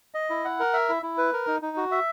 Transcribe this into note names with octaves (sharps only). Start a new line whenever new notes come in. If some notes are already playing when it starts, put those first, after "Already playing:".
D#5
E4
F#5
A#4
E5
E4
E4
B4
A#4
D#4
D#4
F#4
E5